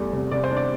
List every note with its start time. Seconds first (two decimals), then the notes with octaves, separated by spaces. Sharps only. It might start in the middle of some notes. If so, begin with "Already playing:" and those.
Already playing: E2 G3 A3
0.13 C3
0.31 C3 D5
0.44 C5
0.51 D4
0.57 D5